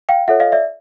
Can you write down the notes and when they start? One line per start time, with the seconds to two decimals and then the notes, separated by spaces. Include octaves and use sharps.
0.09 F5 G5
0.28 F4 A4 C#5 E5 F#5
0.40 D#5 F5
0.52 D5 E5